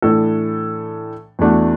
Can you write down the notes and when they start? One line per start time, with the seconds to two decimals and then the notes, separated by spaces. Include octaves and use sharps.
0.02 A2 E3 D4 A4
1.39 E2 E3 A3 D4 F#4